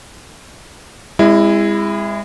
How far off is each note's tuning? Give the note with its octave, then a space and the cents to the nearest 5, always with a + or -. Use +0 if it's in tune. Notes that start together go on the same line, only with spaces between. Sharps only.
G#3 -35 C4 +0 E4 +5